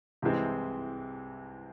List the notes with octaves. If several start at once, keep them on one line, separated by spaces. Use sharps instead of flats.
C2 C3 E3 G#3 C4